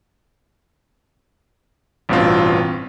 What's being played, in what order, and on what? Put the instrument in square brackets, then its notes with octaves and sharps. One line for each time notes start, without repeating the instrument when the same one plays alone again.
[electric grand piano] A1 G2 B2 C4 F4